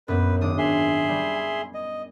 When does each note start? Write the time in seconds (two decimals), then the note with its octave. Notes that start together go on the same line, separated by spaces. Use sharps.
0.08 F#2 A#2 B3 B4
0.41 G#1 D4 D6 D#6
0.58 G#4 E5 C6
1.08 G3
1.34 G#5
1.74 D#5